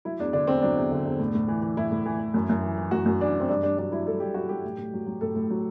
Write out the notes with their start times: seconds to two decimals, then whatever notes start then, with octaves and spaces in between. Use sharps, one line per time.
0.05 F#3 E4
0.19 E2 D4
0.33 D3 D4
0.47 E2 C4
0.62 F#3 D4
0.77 E2
0.92 D3
1.05 E2
1.19 A2
1.34 A2
1.48 E3
1.62 E3
1.77 A2 E4
1.91 A2
2.06 E3
2.20 E3
2.34 F#2
2.49 F#2
2.63 E3
2.78 E3
2.91 F#2 F#4
3.06 F#2
3.20 E3 D4
3.35 E3 C4
3.49 G2 D4
3.63 G2 D4
3.78 F#3 D4
3.92 F#3 E4
4.07 G2 A4
4.20 G2 G4
4.34 F#3 F#4
4.49 F#3 G4
4.64 A2
4.78 A2
4.93 F#3
5.06 F#3
5.21 A2 A4
5.35 A2
5.50 F#3